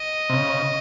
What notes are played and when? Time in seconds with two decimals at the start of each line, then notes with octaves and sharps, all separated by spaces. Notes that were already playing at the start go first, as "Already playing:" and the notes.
Already playing: D#5
0.30 C3
0.33 C#3